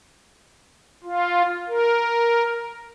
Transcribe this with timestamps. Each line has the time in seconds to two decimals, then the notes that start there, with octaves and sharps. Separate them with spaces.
1.04 F4
1.68 A#4